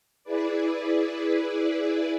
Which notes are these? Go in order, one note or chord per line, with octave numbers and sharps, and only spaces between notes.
E4 G#4 B4 D5